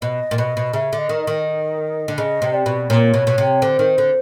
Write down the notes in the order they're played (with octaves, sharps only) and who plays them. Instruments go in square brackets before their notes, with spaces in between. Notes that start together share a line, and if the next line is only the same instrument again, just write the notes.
[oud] B2 [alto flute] D#5
[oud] A#2
[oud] B2 [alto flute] D#5
[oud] B2
[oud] C#3 [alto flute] E5
[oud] D3
[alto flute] D#5
[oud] D#3
[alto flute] D#5
[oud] D#3
D3
[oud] C#3 [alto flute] D#5
[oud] C3
[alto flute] D5
[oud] B2
[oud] A#2 [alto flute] C#5
[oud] B2
B2
C3
[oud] D3 [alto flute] C5
[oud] D#3
D3